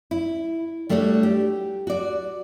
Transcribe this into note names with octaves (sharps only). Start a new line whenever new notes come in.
E4
G3 A3 D4 F#4 C5 C#5
G4
F#4 D5